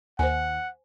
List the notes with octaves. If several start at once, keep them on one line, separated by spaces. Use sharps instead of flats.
D#2 C5 F#5 G#5